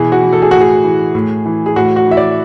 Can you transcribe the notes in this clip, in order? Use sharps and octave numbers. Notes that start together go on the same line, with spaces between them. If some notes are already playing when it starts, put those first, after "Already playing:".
Already playing: B2 E3 G#4
F#4
E3
A4
G#4
A2 F#4
G#4
E3
A2
E3
G#4
A2 F#4
F#4
E3 E5
D5